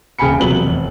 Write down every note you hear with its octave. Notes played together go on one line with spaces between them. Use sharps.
D#1 C#3 G5 G#5 B5 C#7
E1 C3 F3 F#3 B4 F#7
F1